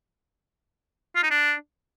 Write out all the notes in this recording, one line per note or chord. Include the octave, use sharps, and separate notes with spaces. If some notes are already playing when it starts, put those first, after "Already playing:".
F4
D#4
D4